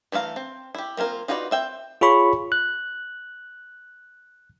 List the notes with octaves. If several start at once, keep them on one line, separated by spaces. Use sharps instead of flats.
E3 A3 D#4 F5 A#5
C4
E4 G4
A#3 C4 F4 A#4
D#4 F4 F#4 B4 D5
C4 E5 G5
F4 G#4 C#5 B5 C#6
F#6